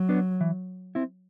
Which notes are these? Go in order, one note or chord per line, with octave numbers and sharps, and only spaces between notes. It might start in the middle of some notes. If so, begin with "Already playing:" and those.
Already playing: F#3
B3 D4
E3
C4 E4